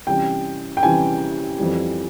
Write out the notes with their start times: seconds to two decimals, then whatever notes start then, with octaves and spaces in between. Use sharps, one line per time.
0.07 C3 E3 G3 C#4 G5
0.77 G5
0.83 C3 E3 G3 C#4 G#5
1.59 F2 E3 G3